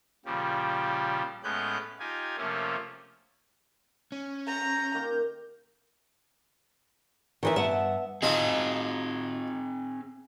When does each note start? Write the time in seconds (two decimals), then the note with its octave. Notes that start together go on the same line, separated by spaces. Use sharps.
0.26 A#2 C#3 F3 G3 G4
1.44 A2 G#3 B3 C#4 F#6 G6
1.99 D#4 F4 G4 G#5
2.37 C3 F3 A3 A#3 C#4
4.12 C#4
4.47 A#5 G6
4.94 D#3 A#3 G4
7.43 D#3 E3 E5
7.56 G2 B3 E5 F#5 A5
8.22 C4 D#4 F4 G#4 A5